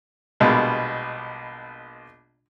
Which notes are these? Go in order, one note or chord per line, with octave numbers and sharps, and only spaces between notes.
A#1 B2 G3 G#3